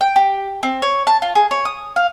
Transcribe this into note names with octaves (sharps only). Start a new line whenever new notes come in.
G5
G4
C4
C#5
A5
F4
G#4
C#5
D#6
F5